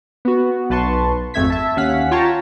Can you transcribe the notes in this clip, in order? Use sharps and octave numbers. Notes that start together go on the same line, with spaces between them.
B3 F#4
B1 B4 A5 C6 C#6
G#1 F2 A3 E5 G#6 B6
E5 A5
D#2 C#4 F5 F#5 B6
F4 C#5 G5 A5 A#5